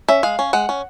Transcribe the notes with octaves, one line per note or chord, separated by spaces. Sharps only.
C#4 E5
G#3 F5
C#4
G#3 F#5
C#4